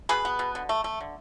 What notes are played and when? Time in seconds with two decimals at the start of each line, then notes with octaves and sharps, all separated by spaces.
0.09 B2 G#4 B4
0.25 B3
0.39 B2
0.55 D3
0.69 A3
0.84 A3
1.01 D3